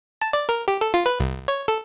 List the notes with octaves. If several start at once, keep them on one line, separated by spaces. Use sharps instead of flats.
A5
D5
A#4
G4
A4
F4
B4
C2
C#5
A4